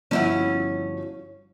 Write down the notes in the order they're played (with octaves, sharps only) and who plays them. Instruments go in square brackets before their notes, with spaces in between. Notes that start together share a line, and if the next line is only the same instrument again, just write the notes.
[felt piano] G1 F3 [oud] C#4 E4 F#4